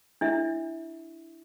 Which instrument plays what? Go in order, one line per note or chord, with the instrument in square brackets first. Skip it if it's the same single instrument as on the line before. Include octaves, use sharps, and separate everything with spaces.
[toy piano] D4 E4 E5